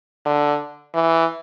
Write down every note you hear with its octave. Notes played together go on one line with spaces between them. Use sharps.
D3
E3